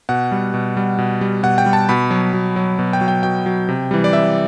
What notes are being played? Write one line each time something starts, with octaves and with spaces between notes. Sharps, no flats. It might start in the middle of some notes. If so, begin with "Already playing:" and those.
B2 F#5
G3
B2
G3
B2
G3
B2 F#5
G5
G3
A5
B2 B5
F#3
B2
F#3
B2
G5
F#3
G5
B2 G5
F#3
C3
E3 G3
D5
C3 E5